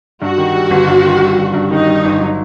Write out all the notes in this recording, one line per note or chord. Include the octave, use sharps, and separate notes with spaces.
G2 F#4
D#3
G3
G1
G2
D#3
G3
G1
G2
D#3 D#4
G3
G1
F#3